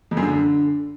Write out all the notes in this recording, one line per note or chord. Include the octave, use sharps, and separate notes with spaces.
F2
F#2
D3